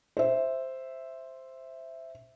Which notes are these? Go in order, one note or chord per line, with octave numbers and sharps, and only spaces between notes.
C5 E5